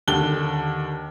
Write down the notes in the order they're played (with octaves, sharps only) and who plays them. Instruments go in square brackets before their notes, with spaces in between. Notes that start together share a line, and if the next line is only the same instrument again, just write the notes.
[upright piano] D#2 D3 A5 F#6 G7